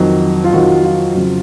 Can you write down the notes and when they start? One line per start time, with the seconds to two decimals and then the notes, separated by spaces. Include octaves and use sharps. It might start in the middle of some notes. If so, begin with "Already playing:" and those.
Already playing: F2 D#3 F#3
0.44 F4
0.53 F2 D#3 F#3 F#4
0.84 F4
1.15 F2 C#3 F#3